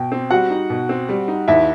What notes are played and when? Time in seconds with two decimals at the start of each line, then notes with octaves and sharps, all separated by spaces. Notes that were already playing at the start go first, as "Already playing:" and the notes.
Already playing: B2 G5
0.12 C4
0.31 G3 F#4 F#5
0.51 D#4
0.70 B2
0.89 C4
1.09 G3
1.28 D#4
1.47 D#2 E4 E5